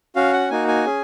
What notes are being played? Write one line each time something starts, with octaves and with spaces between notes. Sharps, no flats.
C#4 F#4 F5
F#5
A#3 D#4 F#4 G#5
G#5
C#4 G#4